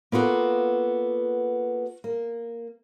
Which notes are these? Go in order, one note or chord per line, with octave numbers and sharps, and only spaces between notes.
A#3 B3 F4 F#4 A4
A#3